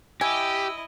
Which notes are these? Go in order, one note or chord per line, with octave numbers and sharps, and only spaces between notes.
E4 G4 D#5 G#5 E6